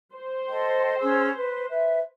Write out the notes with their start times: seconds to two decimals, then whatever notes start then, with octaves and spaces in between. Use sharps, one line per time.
0.14 C5
0.47 A4 D#5 G5
0.99 C#4 G#4 E6
1.36 B4
1.69 B4 E5